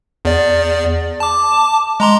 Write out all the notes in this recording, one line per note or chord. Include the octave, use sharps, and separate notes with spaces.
E2 D5
A5 D6
G#3 A#5 C6